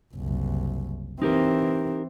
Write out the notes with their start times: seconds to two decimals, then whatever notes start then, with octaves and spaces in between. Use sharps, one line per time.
0.14 F#1 C2
1.22 E3 C4 D#4 G4 A#4